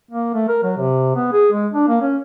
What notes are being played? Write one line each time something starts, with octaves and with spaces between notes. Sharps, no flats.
A#3
A3
A#4
F#3
C3
B3
G#4
G#3
D4
A#3
C#4